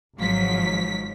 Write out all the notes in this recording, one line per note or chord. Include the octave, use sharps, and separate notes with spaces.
G#1 G#2 F3 F#3 B6